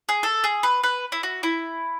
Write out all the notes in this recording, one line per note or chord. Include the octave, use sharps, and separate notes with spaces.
G#4
A4
G#4
B4
B4
E4
F#4
E4